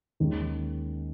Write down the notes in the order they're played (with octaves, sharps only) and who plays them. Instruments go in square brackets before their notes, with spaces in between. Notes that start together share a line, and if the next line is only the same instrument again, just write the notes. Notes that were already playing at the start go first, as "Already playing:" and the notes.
[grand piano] D#2 D#3 G#3 C#4